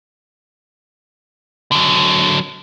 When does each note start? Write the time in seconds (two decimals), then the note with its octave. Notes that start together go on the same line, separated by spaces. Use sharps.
1.72 D3 F#3